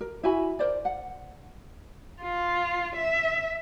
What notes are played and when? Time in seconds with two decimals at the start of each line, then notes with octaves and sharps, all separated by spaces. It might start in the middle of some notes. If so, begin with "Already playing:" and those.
0.01 A#4
0.23 E4 F#4 G#5 B5
0.59 A#4 C5 D5
0.85 F#5
2.22 F4
2.96 E5